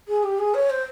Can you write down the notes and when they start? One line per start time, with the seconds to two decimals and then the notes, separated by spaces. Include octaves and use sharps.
0.08 G#4
0.23 G4
0.39 G#4
0.54 C#5
0.70 C5